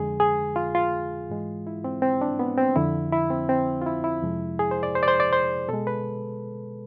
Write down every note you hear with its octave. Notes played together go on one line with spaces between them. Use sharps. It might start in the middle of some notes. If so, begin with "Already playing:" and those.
Already playing: F2 D3 G#3 G#4
G#4
F4
F4
G#2 E3 G#3
E4
C4
C4
D4
B3
C4
F2 D3 F3 E4
E4
C4
C4
F4
E4
E4
F2 C3 F3 G#3
G#4
C5
D5
C5
D5
C5
D5
C5
B2 G#3 A4
B4